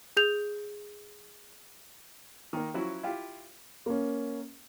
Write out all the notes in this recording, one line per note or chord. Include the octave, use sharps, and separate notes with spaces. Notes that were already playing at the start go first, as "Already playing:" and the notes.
G#4 G6 F7
D#3 A#3
F3 F#3 C#4 E4 F#4
E4 F4 G4 F5
A#3 C#4